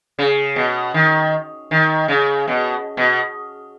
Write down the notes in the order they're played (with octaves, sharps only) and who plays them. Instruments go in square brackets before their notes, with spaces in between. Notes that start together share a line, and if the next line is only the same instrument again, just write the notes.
[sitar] C#3
B2
D#3
D#3
C#3
B2
B2